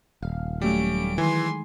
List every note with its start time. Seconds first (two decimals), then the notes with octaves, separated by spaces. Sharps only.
0.22 D#1 F5
0.62 F#3 G3 A3 C#4 D7
1.18 D#3 E3 G#3 G#5 C6